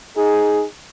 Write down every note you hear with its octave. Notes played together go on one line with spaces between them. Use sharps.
D#4 G#4